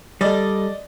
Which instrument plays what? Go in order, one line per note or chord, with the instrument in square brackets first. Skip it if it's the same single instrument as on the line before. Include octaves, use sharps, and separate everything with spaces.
[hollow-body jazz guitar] G3 A4 [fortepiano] D5 D#5